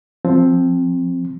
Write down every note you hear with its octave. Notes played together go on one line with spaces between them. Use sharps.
F3 C4